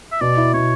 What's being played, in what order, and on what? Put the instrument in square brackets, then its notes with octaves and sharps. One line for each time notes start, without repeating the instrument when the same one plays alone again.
[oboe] E5
[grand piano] B2 [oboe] D5
[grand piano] E4
[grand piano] B2 [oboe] C#5